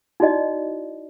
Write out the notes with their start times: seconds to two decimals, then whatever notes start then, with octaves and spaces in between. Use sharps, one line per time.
0.20 D#4 E4 F#4 D5 D#5